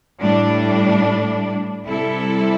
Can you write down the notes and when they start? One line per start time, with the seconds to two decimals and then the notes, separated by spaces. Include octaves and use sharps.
0.21 A2 G3 D4
1.84 C3 G3 E4 A4